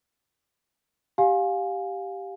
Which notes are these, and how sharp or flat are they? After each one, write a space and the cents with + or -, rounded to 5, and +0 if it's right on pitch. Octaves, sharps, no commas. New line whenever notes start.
G4 +0 F5 +20 G#5 +0